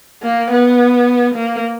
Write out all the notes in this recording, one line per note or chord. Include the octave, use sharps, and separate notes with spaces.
A#3
B3
A#3